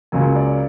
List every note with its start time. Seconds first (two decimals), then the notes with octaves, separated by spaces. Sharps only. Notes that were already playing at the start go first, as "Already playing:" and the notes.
0.12 C#2 C#3 F#3 A#3 G#5
0.35 D5